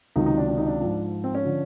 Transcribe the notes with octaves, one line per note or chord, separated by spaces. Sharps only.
C#2 C3 D#3 F#3 D#4
D#4
D4
D4
D#4
D4
G#2 F3
C4
C#4
D3 F3